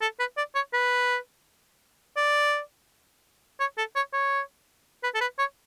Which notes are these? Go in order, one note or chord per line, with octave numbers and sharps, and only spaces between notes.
A4
B4
D5
C#5
B4
D5
C#5
A4
C#5
C#5
B4
A4
B4
C#5